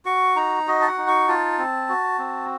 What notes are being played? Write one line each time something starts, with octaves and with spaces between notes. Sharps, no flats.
F#4 C#6
D#4 A#5
F#4 D#5
A5
F#5
D#4
C#6
F4 A5
C4
F#4
C4